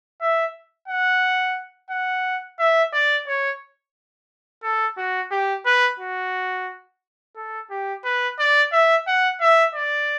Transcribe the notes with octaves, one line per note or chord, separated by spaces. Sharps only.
E5
F#5
F#5
E5
D5
C#5
A4
F#4
G4
B4
F#4
A4
G4
B4
D5
E5
F#5
E5
D5